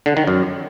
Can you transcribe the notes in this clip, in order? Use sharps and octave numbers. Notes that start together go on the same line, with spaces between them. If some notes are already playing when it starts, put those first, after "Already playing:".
D3
D#3
F#2